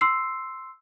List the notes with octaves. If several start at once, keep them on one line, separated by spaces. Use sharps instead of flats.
C6 E6 C7